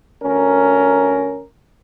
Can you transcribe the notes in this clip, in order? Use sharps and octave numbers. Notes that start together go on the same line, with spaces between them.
D2 C#4 A#4